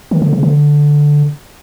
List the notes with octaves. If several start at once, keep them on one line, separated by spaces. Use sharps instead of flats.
D#3
D3
C#3
D3